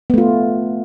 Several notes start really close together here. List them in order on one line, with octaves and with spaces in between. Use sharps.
B3 A3 F4